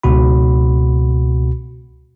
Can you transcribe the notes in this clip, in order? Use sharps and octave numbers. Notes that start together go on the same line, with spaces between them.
C#2 B2 F#4 B5